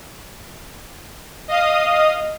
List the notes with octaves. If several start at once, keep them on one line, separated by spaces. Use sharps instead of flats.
D#5 F5 D#6